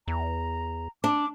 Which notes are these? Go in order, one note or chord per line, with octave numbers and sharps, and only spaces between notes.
E2 A#5
D4 D6